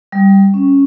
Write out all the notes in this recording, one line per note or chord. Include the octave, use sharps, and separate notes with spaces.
G3
C#4